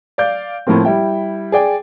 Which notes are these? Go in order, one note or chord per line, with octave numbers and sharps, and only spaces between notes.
D5 F5 G6
A2 F3 A3 A#3 C4
G3 E4 G5
G#4 D5 G5